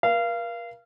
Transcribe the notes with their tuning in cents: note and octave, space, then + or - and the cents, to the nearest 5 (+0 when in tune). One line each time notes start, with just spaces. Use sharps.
A#4 +40 F5 -25